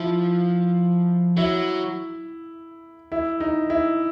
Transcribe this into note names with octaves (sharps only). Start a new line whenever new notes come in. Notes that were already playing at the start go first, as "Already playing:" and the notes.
Already playing: F3 E4
F#3 E4
E4
D#4
E4